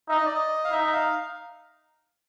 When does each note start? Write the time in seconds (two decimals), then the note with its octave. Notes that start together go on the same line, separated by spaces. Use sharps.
0.09 D#4 E5
0.17 D#5
0.26 D5
0.34 D#5
0.64 F5
0.71 D#4 E5
0.93 F5